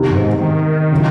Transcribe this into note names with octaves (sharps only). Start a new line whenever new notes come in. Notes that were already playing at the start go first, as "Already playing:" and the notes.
Already playing: E2 C3 D#3
F#2
G#2
D#3
C#3 F#3 C#4 E4